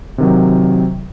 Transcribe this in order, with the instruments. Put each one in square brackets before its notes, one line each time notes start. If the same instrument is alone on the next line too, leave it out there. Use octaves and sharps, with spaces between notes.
[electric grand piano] C3 D#3 F#3